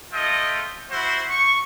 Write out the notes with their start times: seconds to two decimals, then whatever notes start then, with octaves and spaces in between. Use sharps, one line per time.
0.13 A3 F4 D#5 G5
0.91 E4 F#4 C5
1.30 C#6